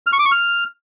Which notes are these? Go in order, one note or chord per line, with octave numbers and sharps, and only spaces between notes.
F6
C#6
D6
C#6
F6